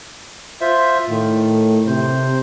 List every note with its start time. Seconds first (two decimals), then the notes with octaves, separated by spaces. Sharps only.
0.61 F4 C5 E5
1.09 A2 D#3
1.87 C3 C5